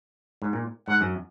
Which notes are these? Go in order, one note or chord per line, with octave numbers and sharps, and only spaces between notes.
G#2
A#2
G#2 F#5
F#2